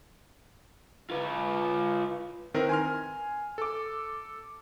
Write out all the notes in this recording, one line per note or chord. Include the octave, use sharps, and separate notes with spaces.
F4 B4
D#3 C4 E4 A#4 B4
G#5 C6 F6
A4 D6